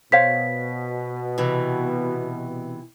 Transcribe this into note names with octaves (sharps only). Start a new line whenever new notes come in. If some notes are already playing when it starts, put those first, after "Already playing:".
B2 C5 C#5 F5 B6
C3 E3